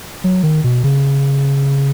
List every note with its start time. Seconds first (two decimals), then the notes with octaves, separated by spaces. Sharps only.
0.24 F#3
0.43 D#3
0.64 B2
0.84 C#3